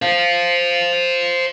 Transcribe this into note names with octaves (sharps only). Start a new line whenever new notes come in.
C5 F5